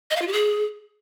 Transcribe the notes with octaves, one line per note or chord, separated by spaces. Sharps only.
D#5
F5
F4
G4
G#4